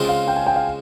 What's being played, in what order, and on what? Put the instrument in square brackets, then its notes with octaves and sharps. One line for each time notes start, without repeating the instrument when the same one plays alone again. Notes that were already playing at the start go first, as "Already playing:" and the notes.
Already playing: [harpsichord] C#3 G#3 C4 F4
[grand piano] F5
G5
G#5
G5
F5